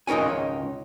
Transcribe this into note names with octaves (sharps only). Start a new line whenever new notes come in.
C#2 D#4 A#4 C#5 G#5